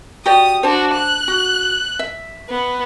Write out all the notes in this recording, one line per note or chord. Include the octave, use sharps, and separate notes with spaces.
F#4 G4 D5 D#6
D4 F#4 C5 A5
F#6
F#4
E5
B3